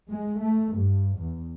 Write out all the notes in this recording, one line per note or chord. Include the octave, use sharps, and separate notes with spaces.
G#3
A3
G2
E2